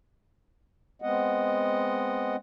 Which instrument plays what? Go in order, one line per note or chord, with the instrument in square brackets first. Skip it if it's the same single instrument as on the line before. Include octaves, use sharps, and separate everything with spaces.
[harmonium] G#3 B3 C4 D#5 F#5